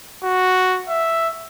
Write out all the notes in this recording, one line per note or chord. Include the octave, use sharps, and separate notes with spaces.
F#4
E5